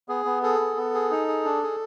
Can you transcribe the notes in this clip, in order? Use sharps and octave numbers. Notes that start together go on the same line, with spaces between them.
B3 G#4
B3
G#4 A4
B3
B3
G#4
D#4
G#4
D4
G#4